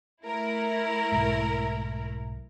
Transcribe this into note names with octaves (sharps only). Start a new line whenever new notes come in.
A3 E4 A#4
B1 G#2